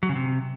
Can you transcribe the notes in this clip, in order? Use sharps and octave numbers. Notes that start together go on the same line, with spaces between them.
F#3
C#3
C3